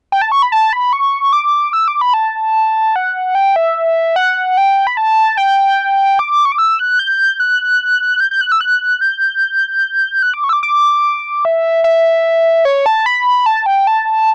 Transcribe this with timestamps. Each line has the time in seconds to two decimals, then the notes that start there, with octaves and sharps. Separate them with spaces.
0.12 G5
0.22 A5
0.32 C#6
0.42 B5
0.52 A5
0.73 B5
0.93 C#6
1.33 D6
1.73 E6
1.88 D6
2.01 B5
2.14 A5
2.96 F#5
3.35 G5
3.56 E5
4.16 F#5
4.57 G5
4.87 B5
4.97 A5
5.37 G5
6.19 D6
6.45 C#6
6.52 D6
6.58 E6
6.79 F#6
6.99 G6
7.40 F#6
8.20 G6
8.31 G6
8.41 F#6
8.52 E6
8.61 F#6
9.01 G6
10.22 F#6
10.34 D6
10.44 C#6
10.49 E6
10.53 D6
10.63 D6
11.45 E5
11.84 E5
12.65 C#5
12.86 A5
13.06 B5
13.46 A5
13.66 G5
13.87 A5